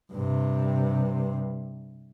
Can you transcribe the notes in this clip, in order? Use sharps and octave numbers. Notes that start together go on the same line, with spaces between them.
G2 C3